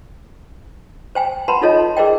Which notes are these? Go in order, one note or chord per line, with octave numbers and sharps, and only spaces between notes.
C5 G5 G#5
B4 F#5 A5 B5 C6
D#4 F4 A4 C#5 D#5 A5
G#4 A#4 C5 D5 D#5 G5